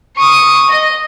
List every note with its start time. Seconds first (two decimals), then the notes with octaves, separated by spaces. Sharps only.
0.16 C#6 D#6
0.70 D#5